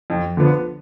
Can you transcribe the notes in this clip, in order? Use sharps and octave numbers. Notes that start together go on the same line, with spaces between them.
F2
D3 F3 B3